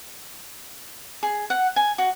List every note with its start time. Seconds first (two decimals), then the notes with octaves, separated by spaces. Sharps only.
1.23 G#4
1.50 F#5
1.76 G#5
1.98 F#4